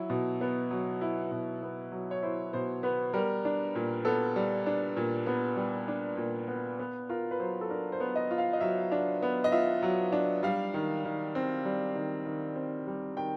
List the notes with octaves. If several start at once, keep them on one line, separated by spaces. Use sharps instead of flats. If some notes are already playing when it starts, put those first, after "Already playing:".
Already playing: F#3 E4
B2
B3
F#3
E4
B2
B3
F#3
C#5
E4 C5
B2 C5
B3 B4
G3 A#4
D4
A#2
B3 A4
G3
D4
A#2
B3
G3
D4
A#2
B3
B3
F4 A#4
B4
F#3 C5
A4
D4 A#4
C5
B3
D#5
F4
F5
D#5
F#3 E5
D4
B3
D#5
F4 E5
F#3
D4
G3 F5
D#3
D#3
C4
G3
D#3
D#3
C4
G3
D#3 G5